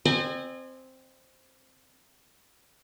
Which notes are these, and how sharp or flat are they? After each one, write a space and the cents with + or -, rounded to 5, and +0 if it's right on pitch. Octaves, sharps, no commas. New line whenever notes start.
C4 +0 D#5 -40 G#5 -5